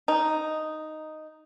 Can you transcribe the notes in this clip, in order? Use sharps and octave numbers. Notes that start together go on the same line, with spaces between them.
D#4